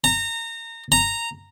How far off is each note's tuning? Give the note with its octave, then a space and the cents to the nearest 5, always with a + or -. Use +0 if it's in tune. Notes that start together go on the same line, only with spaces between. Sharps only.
A#5 -25
A#5 -10